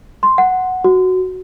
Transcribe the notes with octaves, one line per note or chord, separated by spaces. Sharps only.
C6
F#5
F#4